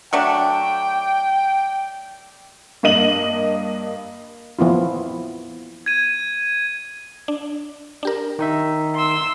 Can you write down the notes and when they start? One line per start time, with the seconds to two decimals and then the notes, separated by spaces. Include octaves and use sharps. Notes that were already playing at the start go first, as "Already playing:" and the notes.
0.13 F#3 A3 D4 G5
2.83 G2 A#3 D#5 D#7 F#7
4.59 F3 B3 E4 F4
5.86 G#6 D#7
7.28 D4
8.03 D4 G4 A#4
8.39 D#3 D#4 E5
8.95 C6 E6